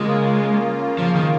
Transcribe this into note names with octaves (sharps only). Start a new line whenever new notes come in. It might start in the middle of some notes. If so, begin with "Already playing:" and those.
Already playing: C#3 G#3 A#3 F4
F3
D#3